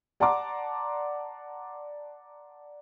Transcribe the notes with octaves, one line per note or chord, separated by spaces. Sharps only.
D5 F#5 A5 A#5 C6 D6